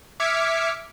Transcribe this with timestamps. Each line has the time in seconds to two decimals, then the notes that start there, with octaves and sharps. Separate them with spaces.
0.20 E5 D6 F6 G#6 B6 C#7